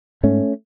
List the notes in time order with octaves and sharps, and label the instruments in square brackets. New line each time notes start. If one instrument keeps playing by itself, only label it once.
[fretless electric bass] G#2 A3 C#4